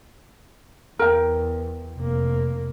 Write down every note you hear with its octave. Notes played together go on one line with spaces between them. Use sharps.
E2 A#4 G5
F1 A#3